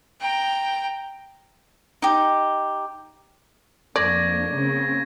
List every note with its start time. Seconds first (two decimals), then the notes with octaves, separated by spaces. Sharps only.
0.21 G5 A#5
2.02 D#4 G4
3.96 F2 A#3 D4 D5 C#6 G#6 A#6
4.53 C#3 A#3 C4